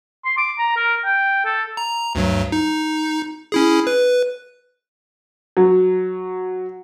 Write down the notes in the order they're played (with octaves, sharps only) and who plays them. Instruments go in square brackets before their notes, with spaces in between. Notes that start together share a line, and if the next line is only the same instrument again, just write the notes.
[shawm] C6
D6
A#5
A#4
G5
A4
[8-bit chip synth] A#5
D2 G2 F#3
D#4
C#4 E4 G#4
B4
[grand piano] F#3